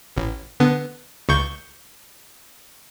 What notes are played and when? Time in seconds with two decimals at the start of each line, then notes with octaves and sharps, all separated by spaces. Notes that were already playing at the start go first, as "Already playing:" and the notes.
0.17 A1
0.60 D3 B3
1.29 C#2 C#6 G6